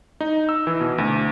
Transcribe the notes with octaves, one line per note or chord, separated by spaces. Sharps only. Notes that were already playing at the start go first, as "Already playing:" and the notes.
D#4
E6
E3
B2
D2